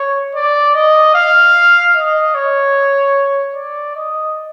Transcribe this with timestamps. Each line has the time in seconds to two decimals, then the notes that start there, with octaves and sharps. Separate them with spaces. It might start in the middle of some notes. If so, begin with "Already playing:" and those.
Already playing: C#5
0.35 D5
0.74 D#5
1.14 F5
1.95 D#5
2.35 C#5
3.55 D5
3.95 D#5